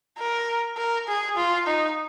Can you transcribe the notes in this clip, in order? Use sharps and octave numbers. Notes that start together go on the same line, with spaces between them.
A#4
A#4
G#4
F4
D#4